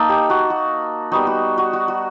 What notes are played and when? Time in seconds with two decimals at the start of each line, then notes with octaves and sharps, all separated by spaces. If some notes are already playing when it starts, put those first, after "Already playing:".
Already playing: A#3 D#4 A4
0.09 G4
0.30 F#4
0.50 F#4
1.12 G3 B3 D#4 F#4
1.27 F#4
1.58 F#4
1.73 F#4
1.88 F#4